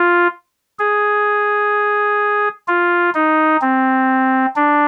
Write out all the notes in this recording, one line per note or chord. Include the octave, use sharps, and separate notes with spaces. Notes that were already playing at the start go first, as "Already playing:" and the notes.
Already playing: F4
G#4
F4
D#4
C4
D4